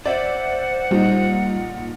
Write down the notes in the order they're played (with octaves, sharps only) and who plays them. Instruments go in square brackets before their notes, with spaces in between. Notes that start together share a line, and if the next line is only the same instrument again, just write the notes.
[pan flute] C5 [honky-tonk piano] D5 E5 [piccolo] F#5
[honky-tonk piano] A#2 D#4 [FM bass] G3